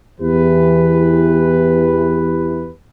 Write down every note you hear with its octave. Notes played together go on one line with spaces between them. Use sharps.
E2 E3 G4 B4